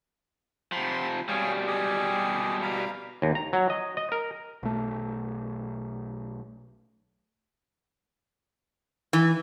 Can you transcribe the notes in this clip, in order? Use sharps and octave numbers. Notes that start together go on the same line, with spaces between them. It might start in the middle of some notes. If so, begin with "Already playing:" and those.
C3 F3 G5 B5 C6
B2 G3 G#4 C#5 F5
G4 G#4 D#5
F5 A#5 B5
D#2
A#5
F#3
D#5
D#5
A#4
B1 A3
E3